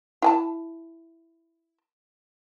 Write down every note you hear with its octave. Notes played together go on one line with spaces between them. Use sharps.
E4 G#5 A5